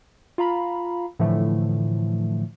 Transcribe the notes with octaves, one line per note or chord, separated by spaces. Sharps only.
F4 F5 A#5 B5
A2 D3 E3 F3 A3